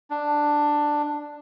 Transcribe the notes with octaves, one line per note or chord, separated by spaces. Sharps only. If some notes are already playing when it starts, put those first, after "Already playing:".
D4